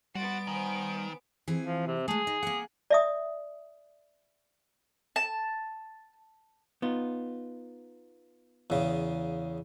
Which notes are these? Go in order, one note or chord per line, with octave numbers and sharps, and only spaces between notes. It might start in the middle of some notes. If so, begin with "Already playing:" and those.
G3 B3 F#4 C6 A6 D7
D#3 C5 G#5
E3 C4 G#4
F3
C3
G#3 A3 G#4
D#4
A#3 F#5
D5 E5 D#6
A5
B3 D#4 F4
E2 C#3